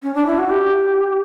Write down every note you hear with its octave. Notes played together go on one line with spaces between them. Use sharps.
C#4
D4
E4
F#4
G4